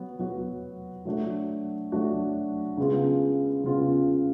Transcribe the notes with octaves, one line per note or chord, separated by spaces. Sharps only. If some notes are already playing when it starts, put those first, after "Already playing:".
Already playing: F#3 B3
F#3 B3 F#4
F#3 A3 D4 F#4
F#3 A3 D4 F#4
C#3 G#3 B3 F4
C#3 G#3 B3 F4